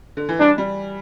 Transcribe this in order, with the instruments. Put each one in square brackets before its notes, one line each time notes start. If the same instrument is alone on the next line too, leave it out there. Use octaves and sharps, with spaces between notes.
[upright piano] D3
E3
[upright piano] G3 [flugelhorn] D4
[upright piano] G3